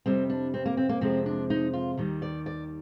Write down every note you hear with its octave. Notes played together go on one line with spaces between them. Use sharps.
F2 C3 G3 C4
D4
C4
A#3
C4
A#3
F2 C3 F3 G#3 C4
D4
D#4
F4
D#2 D#3 G3
D5
D5